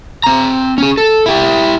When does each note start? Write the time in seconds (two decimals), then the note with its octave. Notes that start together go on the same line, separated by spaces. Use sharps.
0.24 C4 A#5
0.78 C#4 G#4
0.97 A4
1.26 E4 G4